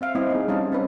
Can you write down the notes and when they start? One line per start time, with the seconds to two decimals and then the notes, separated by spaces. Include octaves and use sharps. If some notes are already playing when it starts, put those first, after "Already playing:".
0.01 C4 E5 F5
0.15 G3 B3 C4 E4 D#5
0.30 D#4 G#4
0.48 G3 C#4 D#4 D#5 F5 A5
0.72 C4 C#4 B4